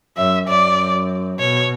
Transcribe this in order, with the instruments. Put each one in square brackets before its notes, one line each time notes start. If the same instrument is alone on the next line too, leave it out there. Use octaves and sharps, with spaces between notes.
[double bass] F#2 [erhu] E5
[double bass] F#2 [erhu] D5
[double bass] B2 [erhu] C#5